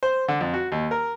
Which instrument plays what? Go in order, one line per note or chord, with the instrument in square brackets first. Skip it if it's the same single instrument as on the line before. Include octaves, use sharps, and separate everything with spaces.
[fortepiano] C5
D3
F2
F#4
D#2
A#4